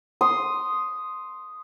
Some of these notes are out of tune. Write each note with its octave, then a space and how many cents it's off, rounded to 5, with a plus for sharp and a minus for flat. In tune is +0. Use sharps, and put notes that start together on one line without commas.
C6 +0 D#6 +0